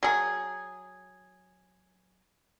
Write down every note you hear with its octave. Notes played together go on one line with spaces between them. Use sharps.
F#3 G#4